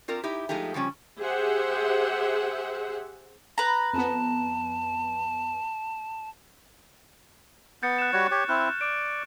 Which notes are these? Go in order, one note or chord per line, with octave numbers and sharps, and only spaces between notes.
C4 F4 A#4 D5
D#4 E4 G4
F3 G#3 A3 D#4 G4
C#3 F3 G3 C#4
G4 G#4 C5 E5 F#5
B4 A#5 B5
F2 B3 A5
B3 G6 A6 C#7
F#6 E7
G3 F#4 C#5 C#6
G4 C#5
C4 E4 F6 F#6
D5 D7